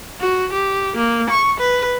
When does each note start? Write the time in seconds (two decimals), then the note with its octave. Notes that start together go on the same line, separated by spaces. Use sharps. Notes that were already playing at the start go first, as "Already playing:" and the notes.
0.20 F#4
0.52 G4
0.96 A#3
1.30 C#6
1.60 B4